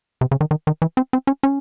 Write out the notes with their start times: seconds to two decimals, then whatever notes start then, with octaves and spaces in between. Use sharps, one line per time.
0.21 C3
0.31 C#3
0.41 D#3
0.51 D#3
0.67 D#3
0.82 E3
0.97 C4
1.13 C4
1.27 C#4
1.43 C#4